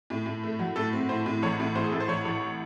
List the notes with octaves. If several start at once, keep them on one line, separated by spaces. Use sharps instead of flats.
A2
A2
A3
F#3
A2 A4
C4
A2 C5
A2
A1 C#5
A2
A2 C5
G#4
A2 A4
C5
A1 C#5
A1